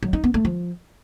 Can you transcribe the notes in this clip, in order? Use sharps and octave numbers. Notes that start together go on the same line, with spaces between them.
F#3
D#4
B3
A3
F3